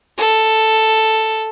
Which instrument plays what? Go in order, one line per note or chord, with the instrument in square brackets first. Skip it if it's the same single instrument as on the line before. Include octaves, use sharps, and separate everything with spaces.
[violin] A4